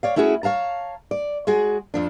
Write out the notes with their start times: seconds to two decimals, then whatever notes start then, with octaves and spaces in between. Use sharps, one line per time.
0.03 C#5 D5 F5
0.16 A3 C#4 E4 F#4 G#4
0.43 C#5 F5 A5 A#5
1.11 D5
1.47 G#3 F#4 G#4
1.94 F2 F3 D4